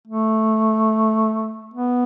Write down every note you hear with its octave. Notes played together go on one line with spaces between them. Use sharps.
A3
B3